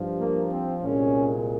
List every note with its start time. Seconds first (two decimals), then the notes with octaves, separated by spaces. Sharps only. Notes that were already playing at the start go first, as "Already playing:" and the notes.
Already playing: G2 F3
0.20 A#3
0.52 C4
0.83 C2 A#2 G#3 C#4